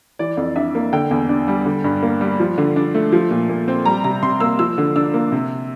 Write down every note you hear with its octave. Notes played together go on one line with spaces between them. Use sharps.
E3 D5
F2
D4 E5
A#3
D3 G5
E2
D4
G3
D3
G2
A#3
G3
F3
D3
D4
A3
F3
A#2
A#2
C4
G3 A#5
C3 A#5
C3 C6
A#3 E6
F3 E6
D3
D4 E6
A#3
C3